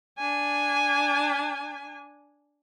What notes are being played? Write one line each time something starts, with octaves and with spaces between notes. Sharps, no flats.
D4 G#5